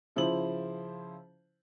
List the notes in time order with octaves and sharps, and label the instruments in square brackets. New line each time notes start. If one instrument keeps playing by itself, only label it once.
[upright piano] C#3 F3 E4 C5 F#7